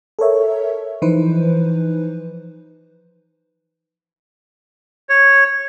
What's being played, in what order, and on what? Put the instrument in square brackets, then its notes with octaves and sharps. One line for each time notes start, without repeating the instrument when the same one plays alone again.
[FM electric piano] A4 A#4 C#5 E5
E3 F3 D#4 B4 C5
[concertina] C#5